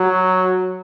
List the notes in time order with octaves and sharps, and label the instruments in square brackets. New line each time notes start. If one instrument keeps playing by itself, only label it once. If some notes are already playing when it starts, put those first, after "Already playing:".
Already playing: [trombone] F#3